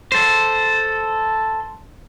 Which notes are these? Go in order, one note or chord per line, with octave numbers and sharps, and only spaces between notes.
A4 C5